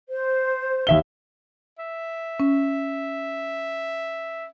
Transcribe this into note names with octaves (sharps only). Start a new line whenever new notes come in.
C5
D#2 E5 G7
E5
C#4